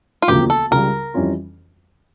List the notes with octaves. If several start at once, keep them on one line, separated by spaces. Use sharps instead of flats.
F4
E1 D2 C#3 F3 A#3 G4
A4
C#2 C#3 G3 A#4
F2 E3 G3 C#4 F4